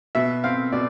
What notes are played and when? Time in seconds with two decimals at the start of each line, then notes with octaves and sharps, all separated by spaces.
0.15 B2 E5
0.44 C4 F5
0.72 B2 D5